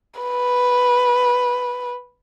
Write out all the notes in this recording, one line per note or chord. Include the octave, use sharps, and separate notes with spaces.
B4